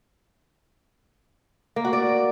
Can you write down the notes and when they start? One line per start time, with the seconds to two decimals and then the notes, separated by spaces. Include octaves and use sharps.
1.76 A#3
1.85 F#4
1.93 D5